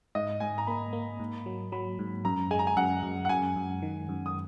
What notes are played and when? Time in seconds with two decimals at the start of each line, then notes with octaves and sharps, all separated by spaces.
0.15 G#2 D#5
0.40 G#2 G#5
0.58 A#5
0.67 A#3 B5
0.93 A#3
1.20 G#2
1.46 F#3
1.72 F#3 B5
1.99 G#2
2.25 F#2 A#5
2.51 G#3 G#5
2.59 A#5
2.67 G#5
2.76 F#2 F#5
3.03 F#2
3.25 F#5
3.29 F#2 G#5
3.56 F#2
3.82 D#3
4.09 F#2
4.26 D#6